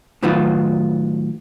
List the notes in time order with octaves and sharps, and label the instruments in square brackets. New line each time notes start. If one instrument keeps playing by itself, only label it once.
[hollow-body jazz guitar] A2 D#3 F#3 B3 D#4 F4